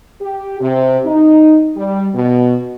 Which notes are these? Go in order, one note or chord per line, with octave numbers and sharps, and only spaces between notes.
G4
C3
D#4
G3
B2